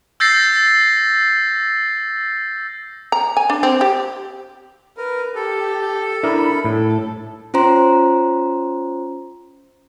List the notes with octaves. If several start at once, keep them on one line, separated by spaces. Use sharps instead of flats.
E6 G6 A6 A#6 C7
A#5
G#5
D4
C4
G4
A#4 B4
G4 A4
D4 E4 A#4 B5
A2 A4
C#4 F4 C5 A#5 C6